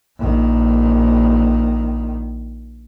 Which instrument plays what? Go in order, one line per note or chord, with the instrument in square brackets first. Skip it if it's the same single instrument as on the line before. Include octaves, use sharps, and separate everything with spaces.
[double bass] A#1 D#3